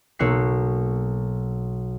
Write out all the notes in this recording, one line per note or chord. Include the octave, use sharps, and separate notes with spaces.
B1 A#3 C#6 E6 F#6 C7